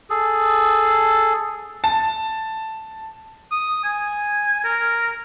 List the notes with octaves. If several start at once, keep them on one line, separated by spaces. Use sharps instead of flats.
G#4 A4
A5
D#6
G#5
A#4